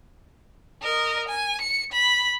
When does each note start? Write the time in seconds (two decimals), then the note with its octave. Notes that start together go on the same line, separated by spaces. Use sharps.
0.82 A#4 D#5
1.28 G#5
1.61 C#7
1.92 B5